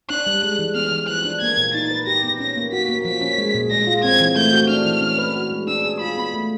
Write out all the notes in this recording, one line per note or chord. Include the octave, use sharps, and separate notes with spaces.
D4 F#6
G3
G#3
E3
B3 F6
E3
F3 F#6
D4
A#3 G#6
A#2
D#4 A6
B4
G4 A#6
B3
C#4 A#6
A#3
F#4 B6
A#3
F3 B6
C#4
G#3
A#2
G#3 A#6
F4
C4 G#6
E3
A3 G6
F#4
D4 F6
E3
C#4
B4
F#4
G#3
D4 E6
G#4
F4 B5
B3
A3